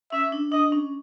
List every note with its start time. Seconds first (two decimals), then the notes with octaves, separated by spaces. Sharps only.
0.12 C#4 E5
0.32 D4
0.52 D4 D#5
0.72 C#4